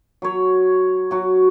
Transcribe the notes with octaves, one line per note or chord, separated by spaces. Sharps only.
F#3 C#5
F#3 F#4